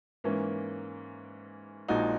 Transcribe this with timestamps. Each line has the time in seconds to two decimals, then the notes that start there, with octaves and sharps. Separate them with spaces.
0.24 G#2 E3 A#3 C#4
1.89 A#1 A#2 G#3 D#4 F#4